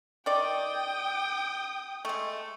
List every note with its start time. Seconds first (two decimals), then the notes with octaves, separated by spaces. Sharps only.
0.26 D#3 D5 G5 D#6
2.05 G#3 A3